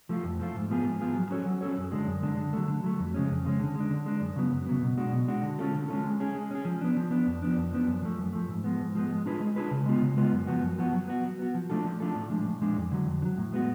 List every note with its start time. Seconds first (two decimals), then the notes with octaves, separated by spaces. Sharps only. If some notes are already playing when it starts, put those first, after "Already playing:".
0.09 F3 A3 F4
0.24 F2
0.40 F3 A3 F4
0.55 G#2
0.70 F3 B3 F4 G#4
0.85 G#2
1.01 F3 B3 F4 G#4
1.15 F#3
1.31 C#4 F#4 A4 C#5
1.46 F#3
1.61 C#4 F#4 A4 C#5
1.77 F#2
1.92 D3 G#3 D4
2.07 F#2
2.23 D3 G#3 D4
2.37 D3
2.53 F#3 A3
2.68 D3
2.84 F#3 A3
2.99 F2
3.14 C#3 G#3 C#4
3.30 F2
3.45 C#3 G#3 C#4
3.60 D3
3.75 G#3
3.80 D4
3.90 D3
4.06 G#3 D4
4.21 F#2
4.36 C#3 F#3 B3
4.52 F#2
4.66 C#3 F#3 B3
4.82 B2
4.97 G#3 D4 F#4
5.12 B2
5.28 G#3 D4 F#4
5.43 D3
5.59 G#3 C#4 F4 A4
5.74 D3
5.88 G#3 C#4 F4 A4
6.04 G#3
6.20 C#4 G#4
6.35 G#3
6.51 C#4 G#4
6.65 F3
6.81 B3 D4
6.97 F3
7.11 B3 D4
7.26 F2
7.42 F3 B3 D4
7.57 F2
7.73 F3 B3 D4
7.87 F#2
8.02 F3 A3
8.19 F#2
8.33 F3 A3
8.48 G#2
8.64 F3 G#3 B3
8.80 G#2
8.95 F3 G#3 B3
9.09 G#3
9.26 D4 F4 G#4 B4
9.40 G#3
9.56 D4 F4 G#4 B4
9.71 C#3
9.86 G#3 B3 F4
10.02 C#3
10.17 G#3 B3 F4
10.33 F#2
10.47 F3 B3 F#4
10.62 F#2
10.78 F3 B3 F#4
10.93 F#3
11.08 B3 F#4
11.24 F#3
11.39 B3 F#4
11.54 F3
11.70 A3 D4 F4 A4
11.84 F3
12.00 A3 D4 F4 A4
12.16 A2
12.31 F3 G#3 D4
12.45 A2
12.62 F3 G#3 D4
12.76 F2
12.92 D3 F#3
13.07 F2
13.22 D3
13.25 F#3
13.38 A2
13.53 G#3 B3 F#4